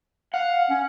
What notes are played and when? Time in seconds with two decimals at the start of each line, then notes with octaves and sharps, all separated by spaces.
0.34 F5 F#5
0.70 C#4